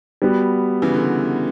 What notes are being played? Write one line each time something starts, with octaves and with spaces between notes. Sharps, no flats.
G3 B3 F#4
C#3 E3
D3